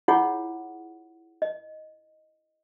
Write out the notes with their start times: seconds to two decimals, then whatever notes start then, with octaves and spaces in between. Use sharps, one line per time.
0.08 E4 F4 G#4 C#5 F#5
1.42 D#5